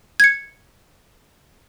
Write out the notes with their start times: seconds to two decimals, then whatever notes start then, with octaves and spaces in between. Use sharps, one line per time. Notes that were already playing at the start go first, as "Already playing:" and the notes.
0.20 G#6 C#7